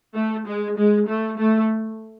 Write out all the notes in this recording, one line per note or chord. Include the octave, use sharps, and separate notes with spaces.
A3
G#3
G#3
A3
A3